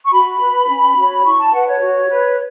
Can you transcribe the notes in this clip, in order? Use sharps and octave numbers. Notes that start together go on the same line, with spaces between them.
C#6
F#4 B5
B4
C#4
F#4 C#5
E4 C#6
A5
B4 F#5
C#5
F#4
B4